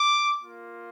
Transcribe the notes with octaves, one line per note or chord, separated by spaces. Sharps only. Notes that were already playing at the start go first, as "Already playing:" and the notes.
Already playing: D6
A#3 F4